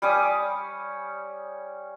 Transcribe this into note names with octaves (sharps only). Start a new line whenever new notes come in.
G3 C#4 D6 D#6